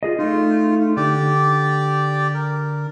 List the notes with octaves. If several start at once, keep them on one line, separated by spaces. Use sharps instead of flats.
F4 G#4 D#5
A3 D#4 F4
D3 G4 D5
A#4